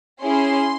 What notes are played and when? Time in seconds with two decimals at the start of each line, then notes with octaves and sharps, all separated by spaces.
0.20 C#4 E4 G#4 C6